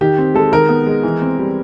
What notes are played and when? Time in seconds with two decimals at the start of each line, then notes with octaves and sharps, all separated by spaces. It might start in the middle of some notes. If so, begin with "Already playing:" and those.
0.01 D#3 G4
0.18 C4
0.34 G#3 A4
0.52 D#3 A#4
0.69 B3
0.86 G#3
1.03 E3
1.22 C4
1.39 G3